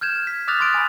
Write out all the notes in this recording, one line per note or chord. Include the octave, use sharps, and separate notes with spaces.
F6 G6 G#6 E7
B6
D6 D#6 F6 F#6 A6 F7
C6 G#6 A6 D7
G#5 B5